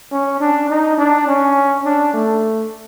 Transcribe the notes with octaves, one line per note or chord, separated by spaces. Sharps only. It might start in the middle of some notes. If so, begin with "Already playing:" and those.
C#4
D4
D#4
D4
C#4
D4
A3